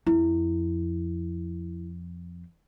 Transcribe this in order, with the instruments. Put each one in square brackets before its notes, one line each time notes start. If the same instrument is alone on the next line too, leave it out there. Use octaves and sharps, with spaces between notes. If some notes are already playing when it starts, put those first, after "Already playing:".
[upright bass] F2 [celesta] E4